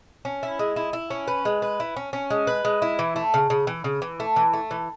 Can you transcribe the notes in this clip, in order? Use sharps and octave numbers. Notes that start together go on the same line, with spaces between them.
C#4
E4
G#3
E4
E4
C#4
B4
G#3
B4
E4
C#4
C#4
G#3
B4
G#3
E4
E3
A3
C#3
C#3
E3
C#3
E3
A3
E3
A3
E3